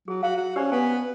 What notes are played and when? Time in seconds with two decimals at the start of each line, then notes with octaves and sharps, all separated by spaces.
0.08 F#3 G#4
0.23 F#4 F5
0.36 F#4
0.56 C#4 G4 C5 D5
0.72 B3 G#5